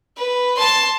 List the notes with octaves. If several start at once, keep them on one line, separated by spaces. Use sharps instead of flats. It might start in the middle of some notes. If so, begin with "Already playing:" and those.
B4
A5 C6